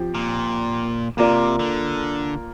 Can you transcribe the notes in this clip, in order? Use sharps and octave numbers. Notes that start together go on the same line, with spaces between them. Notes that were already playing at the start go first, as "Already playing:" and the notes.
Already playing: F3 C4 G4
A#2
C3 A#3 F4 A#4 D5
D3